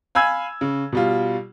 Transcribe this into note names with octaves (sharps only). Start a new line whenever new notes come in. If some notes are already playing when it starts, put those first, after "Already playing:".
F5 G#5 B5 E6 G#6
C#3
B2 G3 F4